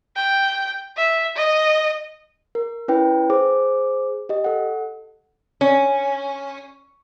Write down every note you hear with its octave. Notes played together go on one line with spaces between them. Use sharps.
G5
E5
D#5
A#4
C#4 E4 B4 G5
G#4 C5 D6
G4 D#5
A4 F#5
C#4